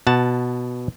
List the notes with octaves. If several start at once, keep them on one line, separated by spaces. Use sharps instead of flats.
B2 F#5 A5